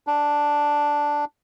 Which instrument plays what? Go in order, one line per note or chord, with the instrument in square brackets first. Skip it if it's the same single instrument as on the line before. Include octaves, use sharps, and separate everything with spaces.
[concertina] D4